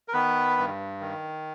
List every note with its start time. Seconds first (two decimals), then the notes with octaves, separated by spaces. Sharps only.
0.08 A#4
0.13 D#3 B3 B4
0.57 G2
1.01 D#3